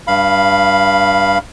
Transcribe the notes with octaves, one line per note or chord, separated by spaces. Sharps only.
G2 F5 B5